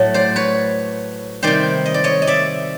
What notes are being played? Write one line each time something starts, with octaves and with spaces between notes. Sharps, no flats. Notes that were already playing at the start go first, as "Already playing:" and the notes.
Already playing: A2 F#3 A3
C5 D5
B4 C#5
C3 D#3 G3 C5 D5
D#5
D5
C#5 D#5
D#5
D5 E5